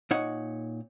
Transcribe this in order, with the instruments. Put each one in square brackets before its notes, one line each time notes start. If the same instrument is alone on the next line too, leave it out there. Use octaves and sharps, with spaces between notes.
[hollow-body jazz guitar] A#2 D#4 C#5 F#5